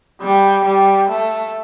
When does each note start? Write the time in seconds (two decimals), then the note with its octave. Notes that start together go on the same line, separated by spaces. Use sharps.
0.21 G3
0.65 G3
1.10 A3